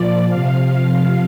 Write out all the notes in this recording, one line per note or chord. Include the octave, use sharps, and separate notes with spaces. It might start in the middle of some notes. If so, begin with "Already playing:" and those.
Already playing: A#2 F3 D5
C3 F3 F5
C3 F3